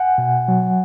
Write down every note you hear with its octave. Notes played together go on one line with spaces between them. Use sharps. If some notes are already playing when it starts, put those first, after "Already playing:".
Already playing: F#5 G#5
B2
F#3